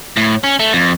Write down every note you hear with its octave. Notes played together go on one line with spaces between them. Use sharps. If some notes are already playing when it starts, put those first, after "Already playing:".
A2
C#4
A3
F2